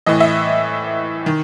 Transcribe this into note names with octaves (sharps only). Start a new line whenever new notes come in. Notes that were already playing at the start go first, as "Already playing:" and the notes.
A2 E3 D#5
E5
D#3